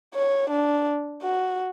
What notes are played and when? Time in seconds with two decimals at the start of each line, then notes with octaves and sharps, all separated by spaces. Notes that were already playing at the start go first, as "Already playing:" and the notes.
0.14 C#5
0.50 D4
1.22 F#4